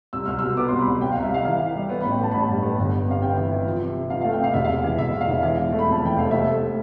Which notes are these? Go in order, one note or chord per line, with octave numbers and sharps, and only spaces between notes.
C2 E6
C2 F6
E6
B2
B3 D6
C6
C2
B5
C2
C2 G5
F5
C2
E5
C2 F5
E3 F5
E3
G3
B3
B5
A1
G5
B3 A5
A1 B5
A5
G2
B3
G1
G1
C3 F5
C3 G5
E3
E3
F3
C3
C3
F3 F5
F5
A3
G5
C3 F5
E1 E5
C3 F5
E3
E1 E5
E2
F5
E1
E3 F5
E3
A3
B5
F2
A5
E3 G5
F1 F5
A3 E5
A3